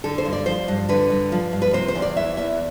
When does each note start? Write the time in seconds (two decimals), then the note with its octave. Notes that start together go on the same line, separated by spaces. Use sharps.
0.04 D3 A4
0.18 C5
0.25 G2
0.33 D5
0.46 F3 C5
0.68 G2
0.89 D3 B4
1.10 G2
1.32 F3
1.53 G2
1.62 B4
1.73 C3 C5
1.88 C5
1.95 E2
2.02 D5
2.17 E3 E5
2.37 E2 E5